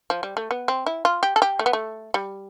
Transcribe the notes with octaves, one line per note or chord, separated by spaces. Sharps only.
F3
G3
A3
B3
C4
E4
F4
G4
A4
G4
A3
B3
A3
G3